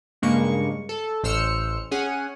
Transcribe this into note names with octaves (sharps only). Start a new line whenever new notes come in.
G2 C#3 G#3 A#3 C#6
A4
A1 C5 E6 F6 C#7
C#4 G#4 F#5 G#5